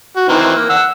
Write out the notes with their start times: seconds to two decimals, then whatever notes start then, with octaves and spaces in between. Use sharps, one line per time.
0.16 F#4
0.28 D#3 E3 C4
0.55 A#3
0.69 F#5 E6